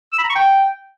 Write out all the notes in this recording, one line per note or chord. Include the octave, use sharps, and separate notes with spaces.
E6
B5
A#5
C#6
G5